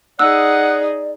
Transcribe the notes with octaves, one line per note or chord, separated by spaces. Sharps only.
D#4 G#4 D5 F#5 E6